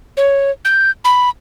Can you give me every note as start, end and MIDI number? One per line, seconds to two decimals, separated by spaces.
0.17 0.51 73
0.65 0.91 91
1.05 1.30 83